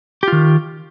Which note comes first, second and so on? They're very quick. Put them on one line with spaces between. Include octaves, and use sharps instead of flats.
G4 F4 D#3